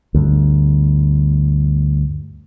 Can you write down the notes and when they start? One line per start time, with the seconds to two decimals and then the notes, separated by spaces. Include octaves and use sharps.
0.14 D2 G2